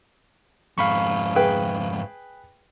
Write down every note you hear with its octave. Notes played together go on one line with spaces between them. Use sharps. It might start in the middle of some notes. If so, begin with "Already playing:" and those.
F2 G#2 F5 B5 C#6
G#4 B4 G5